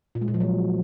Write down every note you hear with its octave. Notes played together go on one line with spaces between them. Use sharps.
A#2
G#3
A#2
F3
F#3